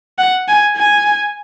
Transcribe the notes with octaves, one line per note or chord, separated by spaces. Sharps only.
F#5
G#5
G#5